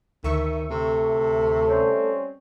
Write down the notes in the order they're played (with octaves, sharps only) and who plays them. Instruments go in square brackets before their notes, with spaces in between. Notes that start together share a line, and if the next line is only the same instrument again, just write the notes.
[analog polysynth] D2 E5 C#6 [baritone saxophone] D#3
[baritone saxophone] C3 [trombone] A3
[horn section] G3 C4 C#4